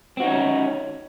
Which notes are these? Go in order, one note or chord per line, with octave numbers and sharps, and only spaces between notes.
C4 C#4 D#4 F#4